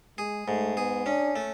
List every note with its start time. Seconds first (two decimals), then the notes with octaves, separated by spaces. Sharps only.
0.18 G#3 G#4
0.48 G#2 A3
0.77 B3 G#4
1.06 C#4 D4
1.36 A3